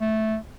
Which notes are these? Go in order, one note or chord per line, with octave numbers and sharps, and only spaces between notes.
A3